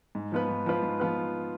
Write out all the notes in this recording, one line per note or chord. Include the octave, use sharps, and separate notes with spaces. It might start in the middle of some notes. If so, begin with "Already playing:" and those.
G#2
F3 B3 F4 B4
G#2
F3 B3 F4 B4
G#2
F3 B3 F4 B4